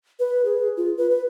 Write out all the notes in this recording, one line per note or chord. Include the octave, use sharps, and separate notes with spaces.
B4
G#4
F4
B4
B4